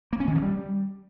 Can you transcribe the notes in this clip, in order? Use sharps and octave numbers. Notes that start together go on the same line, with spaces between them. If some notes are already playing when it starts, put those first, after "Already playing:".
A#3
C#4
D#3
F3
G3